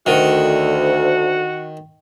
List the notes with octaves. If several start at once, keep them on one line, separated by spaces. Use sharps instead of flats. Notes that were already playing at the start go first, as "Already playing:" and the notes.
D2 D#3 F#4